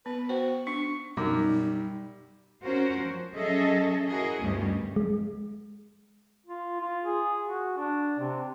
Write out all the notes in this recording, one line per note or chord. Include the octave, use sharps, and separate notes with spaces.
B3 B4
F#4 C5 G5
D4 C#6
F#2 B2 G3 D#4 D6
C#4 F4 F#4 A#4 C5
F3
F#3 C#4 G#4 A4 D#5 E5
E4 F#4 G#4 A#4 D#5
D2 G2 B2 G3 C#4 G4
G#3
F4
F4
G#4
F#4
D4
C3